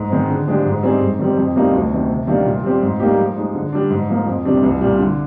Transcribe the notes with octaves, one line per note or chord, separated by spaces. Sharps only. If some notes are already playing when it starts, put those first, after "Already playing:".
Already playing: G#2
D#3 G#3 C4
D3
F3 G#3 D4 G4
G#2
G3 C4 D#4 G#4
G#2
D#3 G3 C4
F2
C3 G3 A#3 D#4
D2
C3 D#3
C3
D#3 G3 A#3 D4
A#2
G3 C4 G4
G#2
G3 A#3 D#4 G4
F3
G#3 D#4
D3
G3 D4
G#2
F3 A#3
F2
C3 D#3 G3 D4
C2
A#2 G3
D3